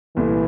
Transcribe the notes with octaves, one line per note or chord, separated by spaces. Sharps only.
C2 A#2 E3 A3